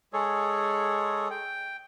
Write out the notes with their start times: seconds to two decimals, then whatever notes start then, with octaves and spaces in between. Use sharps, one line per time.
0.13 G#3 G#4 A4 C#5
1.30 G5